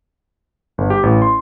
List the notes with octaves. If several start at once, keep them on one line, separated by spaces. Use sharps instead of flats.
G1
G4
A1
C6